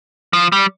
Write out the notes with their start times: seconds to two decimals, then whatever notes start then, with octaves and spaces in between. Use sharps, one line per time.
0.33 F3
0.52 G3